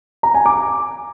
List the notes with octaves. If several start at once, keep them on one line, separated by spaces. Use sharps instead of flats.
A#5
G#5
D6